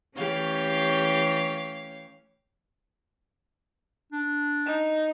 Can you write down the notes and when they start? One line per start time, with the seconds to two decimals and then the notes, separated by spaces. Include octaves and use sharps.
0.16 E3 A3 C#4 G4 C#5 F5
4.13 D4
4.66 D#4